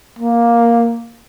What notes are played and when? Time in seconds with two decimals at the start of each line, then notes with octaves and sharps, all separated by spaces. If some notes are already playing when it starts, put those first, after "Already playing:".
0.19 A#3